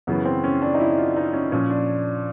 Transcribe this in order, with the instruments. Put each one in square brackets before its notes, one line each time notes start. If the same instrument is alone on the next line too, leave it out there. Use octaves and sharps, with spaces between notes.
[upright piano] F#2 C#3 E3 B3
C4
C#4
D4
D#4
E4
F4
D#4
C#4
A#2 F3 C#4
D4